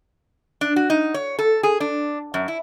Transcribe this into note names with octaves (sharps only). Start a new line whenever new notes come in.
D4
F#4
D#4
C#5
A4
G#4
D4
F#2
E4